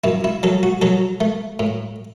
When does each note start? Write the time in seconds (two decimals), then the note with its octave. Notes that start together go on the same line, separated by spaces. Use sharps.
0.04 F#2 E4
0.24 E4
0.43 F#3 A4
0.63 F#4
0.82 F#3 A4
1.21 A3
1.59 A2